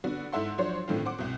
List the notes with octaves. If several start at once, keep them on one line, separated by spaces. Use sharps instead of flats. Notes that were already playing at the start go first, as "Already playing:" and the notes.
D3 B3 F#4
G#2 E4 A4 E5 F#5 C6
F3 F#3 D4 F#4 C5 C#5
A2 D3 D#3 A3 C4 F4
C5 F#5 D6
C2 B2